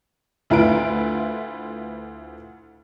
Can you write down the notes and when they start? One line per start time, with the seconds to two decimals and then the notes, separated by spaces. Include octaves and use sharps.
0.50 D2 E4 F4 B4 E5 D7